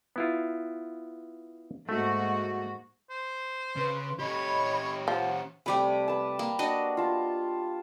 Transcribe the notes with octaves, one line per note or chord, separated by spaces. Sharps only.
B3 E4 F4
G#2 A3 A#3 F#4
C5
C#3 B4 C6
C#4 G4 C#5 D#5 B5
F3 F#5
C3 G3 A3 G4 B5
B4 A5
A#3
D4 F#4 D#5
F4 A5